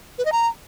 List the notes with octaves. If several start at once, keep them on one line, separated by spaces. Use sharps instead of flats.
B4
D#5
A#5